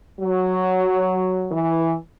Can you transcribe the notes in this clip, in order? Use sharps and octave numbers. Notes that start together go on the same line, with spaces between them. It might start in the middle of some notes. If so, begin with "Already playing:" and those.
F#3
E3